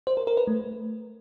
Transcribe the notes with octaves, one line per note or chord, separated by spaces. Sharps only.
C5
A#4
A#4
B4
A3